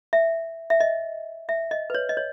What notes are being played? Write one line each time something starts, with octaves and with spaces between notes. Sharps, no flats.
E5
E5
D#5
E5
D#5
B4
C#5
D#5
C#5